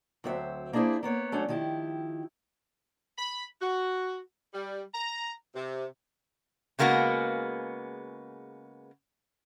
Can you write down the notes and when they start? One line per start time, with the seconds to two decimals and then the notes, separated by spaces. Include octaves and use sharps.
0.24 D2 F#3 C4 C5 E5
0.73 A#3 D4 E4 G#4 C5
1.03 A#3 B3 C#5
1.32 F#3 A3 C#4 D4
1.49 D#3 F3 E4 G4
3.18 B5
3.61 F#4
4.54 G3
4.94 A#5
5.54 C3
6.79 C#3 G#3 A#3 B3 F#4